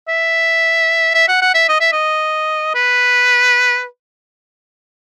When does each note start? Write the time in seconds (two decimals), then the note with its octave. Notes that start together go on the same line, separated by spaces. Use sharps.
0.08 E5
1.15 E5
1.28 F#5
1.41 F#5
1.54 E5
1.69 D#5
1.81 E5
1.92 D#5
2.75 B4